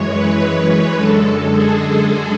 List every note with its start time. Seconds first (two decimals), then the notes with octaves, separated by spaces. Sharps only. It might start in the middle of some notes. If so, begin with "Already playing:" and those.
Already playing: F#2 E3 G#3 C#5
0.10 B4
0.39 B4
0.96 F#2 D3 G#3 A4
1.54 G#4